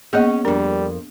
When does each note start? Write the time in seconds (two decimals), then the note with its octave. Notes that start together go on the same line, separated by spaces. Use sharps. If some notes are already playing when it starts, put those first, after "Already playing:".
0.13 A#3 B3 C#4 G#4 D#5
0.45 F2 G3 D4 A#4